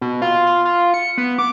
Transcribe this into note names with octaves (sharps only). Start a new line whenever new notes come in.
B2
F4
F4
F4
C#7
B3
D6